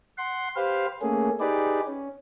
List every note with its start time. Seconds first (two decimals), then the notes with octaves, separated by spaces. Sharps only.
0.18 F#5 C6
0.56 G4 B4 C5 F5
1.02 A3 A#3 C#4 G#4
1.40 D#4 G4 G#4 B4 D5
1.87 C#4